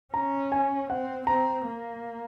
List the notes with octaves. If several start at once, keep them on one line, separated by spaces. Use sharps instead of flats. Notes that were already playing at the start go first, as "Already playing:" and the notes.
C#4 A#5
G#5
C4 F#5
C4 A#5
A#3